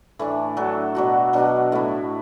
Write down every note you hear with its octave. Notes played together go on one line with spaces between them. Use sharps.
A2 E3 A3 D4
F#3 D4 A4
B2 F#3 D4 F#4
B2 F#3 D4
A2 A3 E4